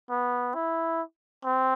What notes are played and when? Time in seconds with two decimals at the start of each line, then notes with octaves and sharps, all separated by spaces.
0.10 B3
0.54 E4
1.45 C4